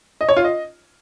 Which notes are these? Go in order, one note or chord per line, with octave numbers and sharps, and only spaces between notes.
D#5
C#5
F4
D#5